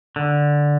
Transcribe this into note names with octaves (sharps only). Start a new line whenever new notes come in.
D3